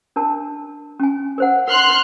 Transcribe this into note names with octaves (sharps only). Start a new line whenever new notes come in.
D4 A#4 A5
C#4 G#5
A#4 C5 F#5
A#4 C6 F6 F#6